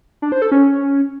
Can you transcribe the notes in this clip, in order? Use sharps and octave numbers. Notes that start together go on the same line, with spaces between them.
D4
C5
A4
C#4